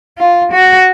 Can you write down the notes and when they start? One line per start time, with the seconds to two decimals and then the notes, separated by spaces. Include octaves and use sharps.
0.18 F4
0.53 F#4